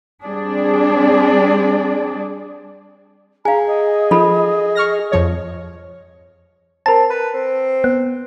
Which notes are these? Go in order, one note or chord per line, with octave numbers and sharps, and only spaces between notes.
G3 C4 D4 G#4 D5
G#4 F5 G#5 A#5
D#5
F3 F4 A4 B5
C#6 F6 A#6
F2 F3 C#5
C4 A#4 A5
B4
C4
B3